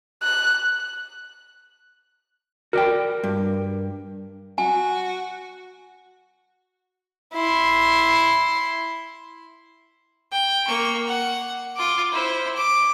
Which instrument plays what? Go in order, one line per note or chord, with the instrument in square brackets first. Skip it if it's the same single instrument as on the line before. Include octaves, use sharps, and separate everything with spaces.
[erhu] F#6
[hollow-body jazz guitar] F#4 D5 G5 [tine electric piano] A#4
[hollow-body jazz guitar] G2
[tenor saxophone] F#4 [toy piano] G#5
[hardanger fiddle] E4 C6
[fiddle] G5
A#3 C#6
F#5
F4 D6
E4 C5
D6